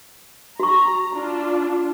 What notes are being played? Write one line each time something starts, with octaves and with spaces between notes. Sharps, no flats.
F#4 A#5 C#6
D4 F4